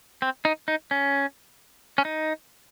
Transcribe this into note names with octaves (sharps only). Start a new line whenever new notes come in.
C4
D#4
D#4
C#4
C#4
D#4